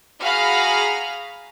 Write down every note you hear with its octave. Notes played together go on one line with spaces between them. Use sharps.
F#4 G#4 F5 A#5 B5 F6